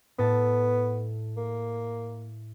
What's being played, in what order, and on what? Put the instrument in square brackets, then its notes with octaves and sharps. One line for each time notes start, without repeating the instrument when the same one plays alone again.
[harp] A2 A4 A6 [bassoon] B3
[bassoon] A#3